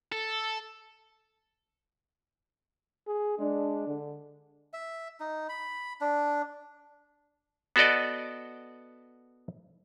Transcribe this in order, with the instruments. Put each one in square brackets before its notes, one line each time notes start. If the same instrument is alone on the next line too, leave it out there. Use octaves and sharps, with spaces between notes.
[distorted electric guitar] A4
[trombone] G#4
[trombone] G#3 [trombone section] D4
[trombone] D3
[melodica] E5
D#4
B5
D4
[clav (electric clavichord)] B3 F#4 A4 D5 D#5